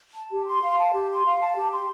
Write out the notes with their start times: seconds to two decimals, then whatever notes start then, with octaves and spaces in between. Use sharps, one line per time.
0.15 A5
0.31 G4
0.46 C6
0.62 F5
0.78 A5
0.93 G4
1.09 C6
1.25 F5
1.40 A5
1.56 G4
1.72 C6